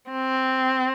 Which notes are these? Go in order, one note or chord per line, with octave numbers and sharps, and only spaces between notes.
C4